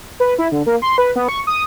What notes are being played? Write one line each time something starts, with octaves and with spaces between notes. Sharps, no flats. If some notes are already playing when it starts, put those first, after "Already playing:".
B4
E4
D3
A#3
C6
B4
B3
C#6
D#6